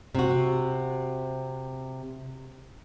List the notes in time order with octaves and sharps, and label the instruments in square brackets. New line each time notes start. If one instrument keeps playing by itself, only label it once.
[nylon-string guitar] C3 F#4